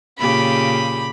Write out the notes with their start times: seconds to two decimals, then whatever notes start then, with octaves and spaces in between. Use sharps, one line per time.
0.19 A#2 C#3 G4 B5